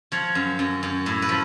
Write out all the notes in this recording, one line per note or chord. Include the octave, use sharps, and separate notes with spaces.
F3 C#5
F#2
F#2
F#2
A2
B4
F3